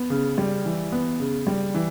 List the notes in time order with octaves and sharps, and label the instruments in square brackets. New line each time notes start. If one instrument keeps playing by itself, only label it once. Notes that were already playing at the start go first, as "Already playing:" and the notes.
Already playing: [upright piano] B3
C#3
G3
E3
B3
C#3
G3
E3